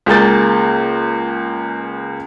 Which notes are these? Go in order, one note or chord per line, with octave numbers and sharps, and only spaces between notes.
C#2 A#3 G#4 G6 A6